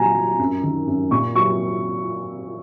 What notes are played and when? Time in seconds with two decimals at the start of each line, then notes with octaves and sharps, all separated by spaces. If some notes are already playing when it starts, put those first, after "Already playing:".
Already playing: A#2 F#3 G#5 A#5
0.15 F#3
0.39 F#2
0.63 D#3
0.87 F#2
1.11 A#2 C#6
1.35 F#3 C#6